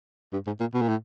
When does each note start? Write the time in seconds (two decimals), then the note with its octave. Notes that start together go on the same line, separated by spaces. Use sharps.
0.33 G2
0.46 G#2
0.60 A#2
0.74 B2
0.81 A#2
0.88 A2